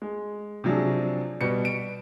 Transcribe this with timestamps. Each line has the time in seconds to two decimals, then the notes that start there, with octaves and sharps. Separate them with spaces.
0.02 G#3
0.64 C3 F3 F#3 D4 G#4
1.41 B2 G3 C#7
1.65 D7